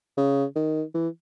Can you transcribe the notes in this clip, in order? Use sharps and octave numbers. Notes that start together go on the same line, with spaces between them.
C#3
D#3
E3